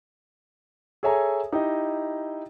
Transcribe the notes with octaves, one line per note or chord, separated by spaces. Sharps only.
G#4 A4 C#5 E5 G#5 A#5
D#4 E4 G4 D#5